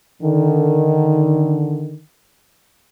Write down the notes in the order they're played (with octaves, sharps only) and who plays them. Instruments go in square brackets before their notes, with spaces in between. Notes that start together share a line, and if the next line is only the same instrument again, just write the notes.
[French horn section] D3 D#3